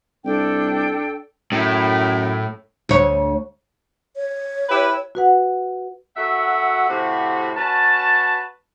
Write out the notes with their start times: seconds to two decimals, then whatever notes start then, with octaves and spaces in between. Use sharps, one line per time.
0.25 C2 D4 A4 G5
1.52 F#2 A2 E4 G5
2.89 D2 C#5
4.16 C#5
4.69 E4 G4 B4
5.15 F#4 B4 F#5
6.17 F#2 F#4 A4 E5 F#5
6.88 A2 C3 F#4
7.56 C#4 F#4 B4 A5